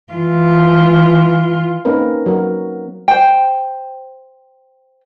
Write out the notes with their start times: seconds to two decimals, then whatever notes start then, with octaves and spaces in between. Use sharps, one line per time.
0.13 E3 F4
1.85 A#3 C4 C#4 D#4 A#4 B4
2.26 F#3 F#4 A#4
3.08 C5 G5